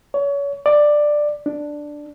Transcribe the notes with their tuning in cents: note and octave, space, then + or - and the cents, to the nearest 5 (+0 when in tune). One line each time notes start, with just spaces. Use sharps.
C#5 +30
D5 +10
D4 +5